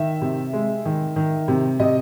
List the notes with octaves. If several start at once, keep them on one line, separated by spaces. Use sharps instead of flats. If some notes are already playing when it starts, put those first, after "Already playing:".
Already playing: D#3 E5
C3
G#3
D#3
D#3
C3
C3 D#5